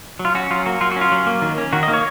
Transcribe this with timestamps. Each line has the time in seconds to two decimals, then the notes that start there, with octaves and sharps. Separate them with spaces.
0.19 F#3
0.25 F4
0.35 C#4 F#4
0.51 F#3 F4
0.66 A#3 F#4
0.81 F#3 F4
0.92 F#4
0.96 C#4
1.01 F4
1.12 F#3
1.27 A#3
1.42 D#3
1.58 C#4
1.73 D#3 F#4
1.83 D#5
1.88 A#3
1.93 C#5